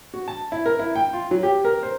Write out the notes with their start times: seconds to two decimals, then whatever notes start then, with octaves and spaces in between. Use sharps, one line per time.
0.14 F#4
0.28 A5
0.52 E4
0.66 A#4
0.79 E4
0.96 G5
1.13 F4
1.31 F#3
1.43 G4
1.65 A#4
1.83 C5